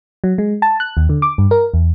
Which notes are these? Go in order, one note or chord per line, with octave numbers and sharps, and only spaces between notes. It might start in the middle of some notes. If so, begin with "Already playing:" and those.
F#3
G#3
A5
F#6
D#2
D3
D6
G2
A#4
E2